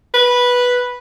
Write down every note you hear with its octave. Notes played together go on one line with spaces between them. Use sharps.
B4